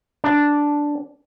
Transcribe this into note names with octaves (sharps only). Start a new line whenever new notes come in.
D4